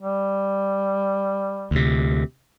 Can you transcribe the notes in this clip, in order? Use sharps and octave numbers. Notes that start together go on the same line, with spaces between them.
G3
D2 C3